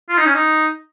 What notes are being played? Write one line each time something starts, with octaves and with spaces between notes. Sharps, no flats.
F4
D#4
C#4
D#4